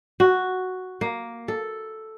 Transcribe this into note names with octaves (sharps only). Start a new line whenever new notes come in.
F#4
A#3
A4